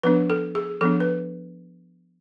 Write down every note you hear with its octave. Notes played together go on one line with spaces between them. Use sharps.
F3 B3 D4 B4
A4
G#4
F3 B3 D4 A4
B4